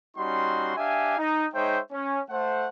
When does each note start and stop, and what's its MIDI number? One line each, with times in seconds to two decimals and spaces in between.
0.17 0.76 55
0.17 0.76 61
0.17 0.76 63
0.17 0.76 66
0.17 0.76 84
0.77 1.16 62
0.77 1.16 67
0.77 1.16 76
0.77 1.16 77
0.77 1.16 80
1.19 1.46 63
1.54 1.80 56
1.54 1.80 63
1.54 1.80 72
1.54 1.80 73
1.54 1.80 76
1.54 1.80 79
1.92 2.20 61
2.30 2.69 57
2.30 2.69 72
2.30 2.69 78